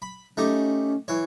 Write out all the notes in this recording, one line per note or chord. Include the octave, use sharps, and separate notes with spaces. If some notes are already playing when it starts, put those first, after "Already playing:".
B5
A3 C#4 D#4 G4
E3 C#5